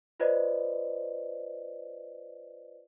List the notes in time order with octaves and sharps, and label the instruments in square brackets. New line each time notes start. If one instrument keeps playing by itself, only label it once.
[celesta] F4 B4 C5 D5 D#5